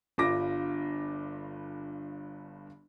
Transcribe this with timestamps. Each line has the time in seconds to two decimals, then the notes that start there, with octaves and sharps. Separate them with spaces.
0.18 G1 G2 F4 D6 A#6